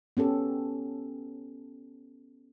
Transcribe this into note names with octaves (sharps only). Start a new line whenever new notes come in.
B3 C#4 G4 A4